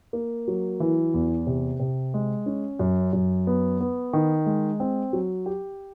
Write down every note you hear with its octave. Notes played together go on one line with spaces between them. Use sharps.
A#3
F#3
E3
E2
C3
C3
G#3
C#4
F#2
F#2
B3
B3
D#3
G#3
C4
F#3
G4